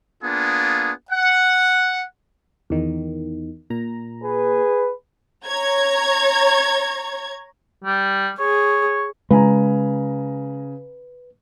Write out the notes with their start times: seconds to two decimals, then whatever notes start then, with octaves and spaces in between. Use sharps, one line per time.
0.22 A#3 B3 D4 F4 G#4
1.11 F#5
2.70 E2 D#3
3.70 A#2 A#5
4.23 G#4 B4
5.46 C#5 A#5 G#6
7.84 G3
8.39 G#4 C#5
9.31 C#3 G#3 B4 G#5 A#5